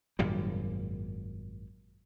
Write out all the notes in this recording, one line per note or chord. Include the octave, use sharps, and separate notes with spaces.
G#1 F#2 A#2 G3